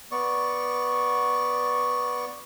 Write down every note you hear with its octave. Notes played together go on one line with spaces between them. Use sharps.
B3 D5 C#6